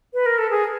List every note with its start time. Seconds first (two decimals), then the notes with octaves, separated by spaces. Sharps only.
0.14 B4
0.26 A#4
0.38 A4
0.50 G#4